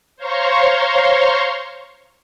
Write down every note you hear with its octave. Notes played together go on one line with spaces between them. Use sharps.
C5 C#5 F5 A#5 C6 C#6